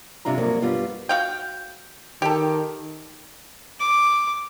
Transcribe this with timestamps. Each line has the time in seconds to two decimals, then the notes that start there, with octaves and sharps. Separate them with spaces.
0.25 G2 C3 D4 F4 A#5
0.38 G2 F3 F#3 A#3 A4
0.62 G2 G3 B3 F4
1.09 F#4 F5 G5
2.22 D#3 G4 A4
3.80 D6